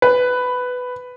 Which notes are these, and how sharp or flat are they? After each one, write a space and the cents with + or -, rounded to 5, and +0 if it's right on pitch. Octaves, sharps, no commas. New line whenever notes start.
B4 +10